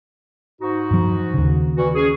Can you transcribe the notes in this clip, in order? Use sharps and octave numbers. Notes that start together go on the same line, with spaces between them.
G#2 D#4 F#4
G2 F3
D#2 C#3
E3 G3 F#4
C#4 G#4